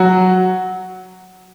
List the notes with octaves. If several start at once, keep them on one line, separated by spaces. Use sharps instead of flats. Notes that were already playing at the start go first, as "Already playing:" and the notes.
Already playing: F#3 F#4